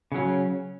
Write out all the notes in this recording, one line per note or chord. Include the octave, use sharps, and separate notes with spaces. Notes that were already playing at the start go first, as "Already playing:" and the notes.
C#3 F#3 C#4